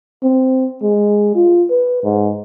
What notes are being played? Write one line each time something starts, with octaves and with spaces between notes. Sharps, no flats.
C4
G#3
F4
B4
G#2